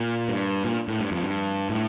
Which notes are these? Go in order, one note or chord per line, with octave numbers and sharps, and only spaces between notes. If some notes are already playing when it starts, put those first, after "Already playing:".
Already playing: A#2
G2
A#2
A2
G2
F2
G2
A2